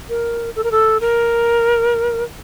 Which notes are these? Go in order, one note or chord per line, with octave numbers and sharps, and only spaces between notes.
A#4
A4
A#4
A4
A#4